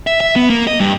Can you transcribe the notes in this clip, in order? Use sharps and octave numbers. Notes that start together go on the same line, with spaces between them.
E5
E5
B3
A#3
D#5
G2